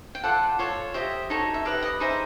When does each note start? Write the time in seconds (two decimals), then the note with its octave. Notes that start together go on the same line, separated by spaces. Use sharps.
0.15 G5
0.24 F4 A4 D5 F#5
0.59 F4 A4 C#5
0.94 G4 C5 D#5 E5
1.30 D#4 F#4 A4 C#5
1.54 E5
1.65 G4 B4 D#5 F5
1.83 D#5
2.00 D#4 G#4 C5 E5